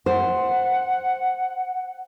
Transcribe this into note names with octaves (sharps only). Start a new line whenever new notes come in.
C5 F#5